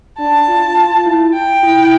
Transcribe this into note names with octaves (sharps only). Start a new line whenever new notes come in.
D4 A5
F4
F4
E4
G5
E4